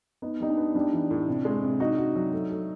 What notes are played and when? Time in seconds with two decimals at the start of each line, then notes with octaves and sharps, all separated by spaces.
0.22 B3 D#4
0.40 G3 D#4
0.49 D4
0.57 B3
0.75 G3 D4
0.93 E3
1.11 A2
1.28 C3
1.45 G#3
1.63 C3
1.80 D#4 F#4
1.98 F#4
2.15 F#3
2.33 A3
2.50 A3